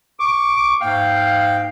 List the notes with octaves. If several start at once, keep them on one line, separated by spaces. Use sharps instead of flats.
C#6 D6
G#2 A#3 F5 G5